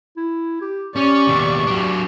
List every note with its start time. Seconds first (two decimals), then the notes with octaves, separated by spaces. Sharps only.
0.17 E4
0.61 G4
0.96 C#4 G4 D5 C#6
1.27 D#2 B2
1.67 F#3 D4